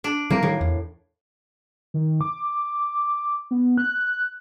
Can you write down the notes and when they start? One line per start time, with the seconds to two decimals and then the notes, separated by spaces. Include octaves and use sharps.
0.04 D4
0.30 E3 G3 A#3 C4
0.43 A2 D#3 F3 G3
0.61 E2
1.94 D#3
2.21 D6
3.51 B3
3.78 F#6